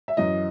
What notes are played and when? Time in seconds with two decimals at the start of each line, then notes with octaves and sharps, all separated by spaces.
0.08 E5
0.17 F#2 E3 D#5